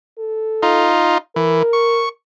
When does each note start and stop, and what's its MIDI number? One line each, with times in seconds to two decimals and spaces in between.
0.19 0.92 69
0.63 1.18 63
0.63 1.18 65
1.36 1.63 52
1.36 2.07 70
1.73 2.09 85